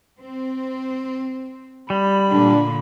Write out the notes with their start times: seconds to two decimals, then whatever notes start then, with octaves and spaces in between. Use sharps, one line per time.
0.20 C4
1.90 G3 B5
2.32 A#2 D3 D4